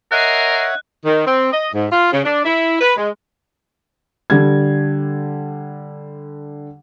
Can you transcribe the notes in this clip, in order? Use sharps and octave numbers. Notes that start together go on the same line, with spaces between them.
A#4 C#5 D#5 E5 F#5 F#6 C7
D#3
C4
D#5
G#2
F4
C#3
D4
E4
B4
G#3
D3 G3 G#6